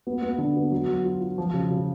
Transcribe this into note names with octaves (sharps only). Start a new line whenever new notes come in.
B3
B3
D3
B3
F#3
F#3
F4
F4
F3
C#3
C#3